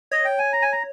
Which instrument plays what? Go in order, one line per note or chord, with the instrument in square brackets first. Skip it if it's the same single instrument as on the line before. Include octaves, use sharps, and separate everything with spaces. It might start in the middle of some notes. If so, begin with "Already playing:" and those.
[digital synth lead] C#5 [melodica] D#5
[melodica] G5
G#5
A#5
G#5
A#5